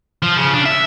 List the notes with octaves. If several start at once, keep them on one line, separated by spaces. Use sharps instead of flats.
F3
C#3
D4
E5